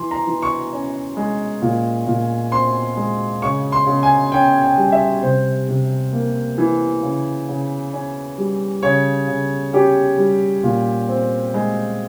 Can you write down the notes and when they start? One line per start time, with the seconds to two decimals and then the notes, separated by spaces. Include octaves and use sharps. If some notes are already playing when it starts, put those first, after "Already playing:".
Already playing: E3 C6
0.11 A#5
0.27 E3
0.42 C#6
0.72 C#4
1.17 G#3
1.62 A#2
2.06 A#2
2.51 C4 C6
2.97 G#3
3.42 C#3 C#6
3.72 C6
3.87 C#3
4.03 G#5
4.32 C#4 G5
4.62 G5
4.77 G3
4.92 E5
5.22 C3 C5
5.68 C3
6.13 A#3
6.58 E3
7.03 C#3
7.48 C#3
7.93 C#4
8.38 G3
8.83 C#3 C#5
9.28 C#3
9.73 C#4 G4
10.18 G3
10.63 A#2
11.09 C4
11.54 G#3